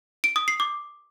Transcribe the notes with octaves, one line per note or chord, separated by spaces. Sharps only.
D7
D#6
C7
D6